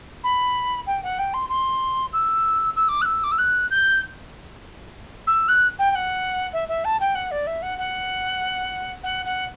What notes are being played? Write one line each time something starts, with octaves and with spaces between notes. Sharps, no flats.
B5
G5
F#5
G5
C6
C6
E6
E6
D6
F#6
E6
D6
E6
F#6
G6
E6
F#6
G5
G5
F#5
E5
E5
A5
G5
F#5
D5
E5
F#5
F#5
F#5
F#5